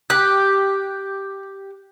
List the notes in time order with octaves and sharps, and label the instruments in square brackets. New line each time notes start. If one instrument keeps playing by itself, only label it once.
[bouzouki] G4 [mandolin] F#6